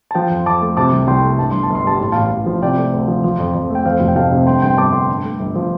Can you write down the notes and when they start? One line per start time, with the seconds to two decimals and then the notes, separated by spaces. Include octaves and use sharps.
0.11 A5
0.15 F3 G5 C6
0.30 F2
0.46 F2 A5 D6
0.61 A3
0.77 C3 A5 D6
0.92 C2
1.07 C2 G5 C6
1.23 A3
1.38 G2 A5
1.51 G1 C6
1.63 A5
1.70 G1
1.75 C6
1.84 G3 A5
1.99 A2 C6
2.12 A1 F5 A5
2.31 A1
2.46 F3
2.62 C3 D5 G5
2.77 A3
2.93 D2
3.08 F3
3.24 F3
3.39 F2
3.55 F2
3.70 A3 G5
3.85 F2 C5 F5
4.00 F1
4.08 G5
4.16 F1 F5 A5
4.32 C3
4.47 G2 G5 C6
4.62 G1 G5 C6
4.77 G1 A5 D6
4.93 D3 G5 C6
5.09 G2
5.24 A3
5.39 G1
5.56 F3